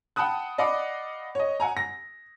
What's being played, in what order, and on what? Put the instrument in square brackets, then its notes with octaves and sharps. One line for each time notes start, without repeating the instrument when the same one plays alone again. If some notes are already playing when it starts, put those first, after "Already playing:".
[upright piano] F#5 G5 A5 B5 D#6 F#6
D5 D#5 F5 F#5 B5 D6
C#5 D#5
F#5 G#5 A#5
A#6